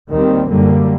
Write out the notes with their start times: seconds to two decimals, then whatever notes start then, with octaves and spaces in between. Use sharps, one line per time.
0.10 D#2 D#3 G3 C4
0.49 F#2 D3 G3 A#3